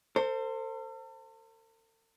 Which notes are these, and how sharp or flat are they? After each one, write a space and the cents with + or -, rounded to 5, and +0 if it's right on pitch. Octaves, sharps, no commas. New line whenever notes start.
A4 +45 C5 +0